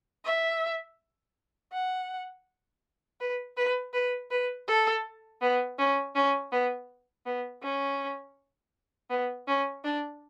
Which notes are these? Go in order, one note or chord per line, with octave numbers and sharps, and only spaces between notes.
E5
F#5
B4
B4
B4
B4
A4
B3
C#4
C#4
B3
B3
C#4
B3
C#4
D4